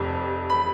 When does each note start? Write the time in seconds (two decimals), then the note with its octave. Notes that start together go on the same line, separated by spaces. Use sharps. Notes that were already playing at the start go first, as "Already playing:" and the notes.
Already playing: F1 F2 C3
0.50 B5